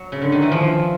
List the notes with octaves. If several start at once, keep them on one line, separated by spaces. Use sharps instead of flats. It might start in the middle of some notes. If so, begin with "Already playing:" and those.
Already playing: F#3
C#3
D3
D#3
E3
F3